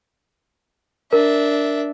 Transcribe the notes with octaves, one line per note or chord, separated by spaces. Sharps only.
D4 A#4 E5